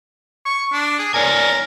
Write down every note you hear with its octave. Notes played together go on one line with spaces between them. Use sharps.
C#6
D4
G#4
A#4 C#5 D5 G#5